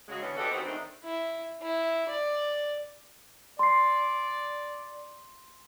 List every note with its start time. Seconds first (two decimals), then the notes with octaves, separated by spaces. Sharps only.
0.07 C#3 F#3 G#3
0.21 D3 E3 B3 C#4
0.37 D4 F#4 G4 A4 B4 D#5
0.51 D#3 E3 F#3 B3 C4
0.65 D#3 G#3 A3 C4 D4 D#4
1.04 E4
1.63 E4
2.09 D5
3.59 D5 C6 C7